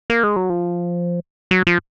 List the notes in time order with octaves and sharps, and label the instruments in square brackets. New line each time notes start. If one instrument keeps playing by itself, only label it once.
[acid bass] A#3
G#3
F#3
F3
F#3
F3